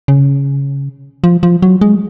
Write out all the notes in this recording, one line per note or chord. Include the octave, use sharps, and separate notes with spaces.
C#3
F3
F3
F#3
G#3